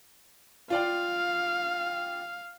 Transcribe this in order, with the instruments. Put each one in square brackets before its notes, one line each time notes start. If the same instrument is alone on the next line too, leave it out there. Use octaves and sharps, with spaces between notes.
[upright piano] F4 D5 G5 [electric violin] F5